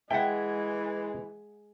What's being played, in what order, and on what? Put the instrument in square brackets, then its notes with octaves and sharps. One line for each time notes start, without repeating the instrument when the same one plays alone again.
[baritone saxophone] E3 [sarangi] G#3 [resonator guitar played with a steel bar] E5 F#5 [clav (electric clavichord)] G5